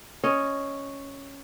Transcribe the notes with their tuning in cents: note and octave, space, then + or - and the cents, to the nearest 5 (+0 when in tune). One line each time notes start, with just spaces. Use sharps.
C#4 +0 D#5 +0